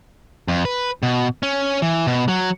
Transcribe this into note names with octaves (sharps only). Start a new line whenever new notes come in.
F2
B4
B2
C#4
E3
B2
F#3